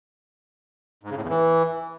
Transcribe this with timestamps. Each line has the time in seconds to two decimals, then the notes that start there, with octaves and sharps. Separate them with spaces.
1.03 G#2
1.10 C#3
1.16 A2
1.23 E2
1.30 E3